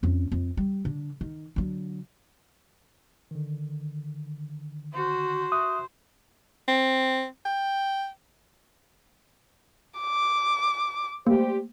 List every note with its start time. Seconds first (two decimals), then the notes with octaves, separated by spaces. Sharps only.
0.03 F2 C#4
0.32 F2
0.57 G3
0.85 D3
1.21 D#3
1.56 D3 F#3
3.31 D3 D#3
4.94 F#4 C5
5.52 E5 C#6 D#6 F#6
6.68 C4
7.46 G5
9.99 D6
11.27 G3 A3 A#3 G4 C5